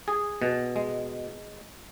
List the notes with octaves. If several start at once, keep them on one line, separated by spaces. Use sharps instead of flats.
G#4
B2
G#3